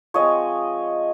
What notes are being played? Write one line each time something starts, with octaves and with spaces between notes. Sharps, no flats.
F3 G#3 C4 C#5 D#5